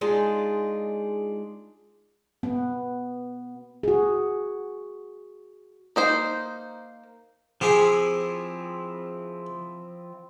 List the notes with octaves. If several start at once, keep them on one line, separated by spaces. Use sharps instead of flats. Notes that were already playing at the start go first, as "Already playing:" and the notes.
G#3 D4 D#4 F4
B3
F#4 G#4
A#3 D#4 C5
F3 C4 E4 G4 G#4